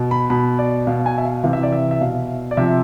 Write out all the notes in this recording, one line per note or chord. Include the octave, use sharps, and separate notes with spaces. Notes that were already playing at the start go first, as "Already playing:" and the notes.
Already playing: B2
B5
B2 B5
D5
B2 F5
G#5
E5
F5
C3 E3 F5
E5
D5
E5
E5
B2 F5
D5
C3 F3 E5